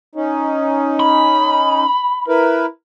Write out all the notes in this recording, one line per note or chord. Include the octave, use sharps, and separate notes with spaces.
C#4 D#4
B5
E4 A#4 B4